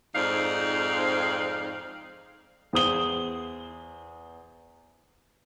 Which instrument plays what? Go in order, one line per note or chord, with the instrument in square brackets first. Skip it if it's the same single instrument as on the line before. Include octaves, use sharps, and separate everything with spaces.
[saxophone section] F2 G#2 C4 D#4 D5 F5
[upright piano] E2 C5 D#6 G7